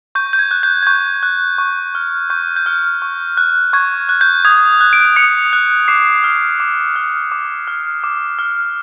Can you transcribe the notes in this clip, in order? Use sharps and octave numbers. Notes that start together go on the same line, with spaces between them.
C#6 G6
G6
G#6
F#6
G6
G#6
C#6 G6
F#6
C#6
F6
C#6 G6
G6
F6
C#6
F#6
C#6 G#6
F#6
G6
D#6 G#6
F#6
D7
D#6 C#7
F#6
D6 C7
F6
D6
F6
D6
F6
D6
F6